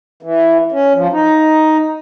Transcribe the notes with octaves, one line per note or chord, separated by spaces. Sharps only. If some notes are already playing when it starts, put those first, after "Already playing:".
E3
C#4
F3
D#4